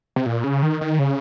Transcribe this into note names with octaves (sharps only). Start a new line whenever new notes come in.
C3
A#2
C#3
D#3
D#3
C#3